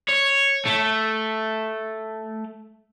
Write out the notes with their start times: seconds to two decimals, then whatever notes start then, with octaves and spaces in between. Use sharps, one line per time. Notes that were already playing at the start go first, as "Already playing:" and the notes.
0.08 C#5
0.65 A3